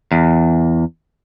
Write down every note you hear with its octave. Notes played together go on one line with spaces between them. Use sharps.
E2